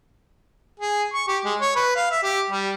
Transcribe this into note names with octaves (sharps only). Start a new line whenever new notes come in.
G#4
C#6
G4
G#3
C#5
B4
F5
E5
G4
G3